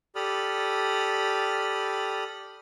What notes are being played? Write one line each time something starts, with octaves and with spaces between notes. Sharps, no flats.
G4 A4 D5 B5 D#6 F6